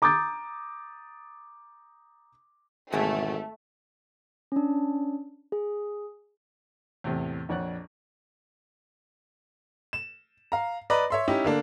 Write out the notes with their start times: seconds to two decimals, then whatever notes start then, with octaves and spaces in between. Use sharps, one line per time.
0.02 A#5 D6 D#6 G6 A6
2.92 G#1 E2 B2 A3 G#4
4.52 C#4 D4
5.52 G#4
7.04 E2 A2 C3
7.49 A#1 F2 C#5 D5 F#5 F#6
9.93 E7
10.52 F5 A#5
10.90 B4 D5 D#5 A#5 B5
11.10 C#5 E5 C6
11.28 C#4 D#4 E4 G4
11.44 D3 A#3 D4